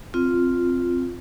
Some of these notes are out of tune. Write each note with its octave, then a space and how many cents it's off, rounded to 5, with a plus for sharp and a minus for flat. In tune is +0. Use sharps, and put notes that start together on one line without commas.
C4 +0 F4 +0